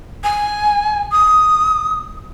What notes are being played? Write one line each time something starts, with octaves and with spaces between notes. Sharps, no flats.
G#5
D#6